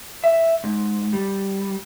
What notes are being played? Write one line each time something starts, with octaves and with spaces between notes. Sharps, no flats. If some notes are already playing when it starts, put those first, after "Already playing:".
E5
G#2
G3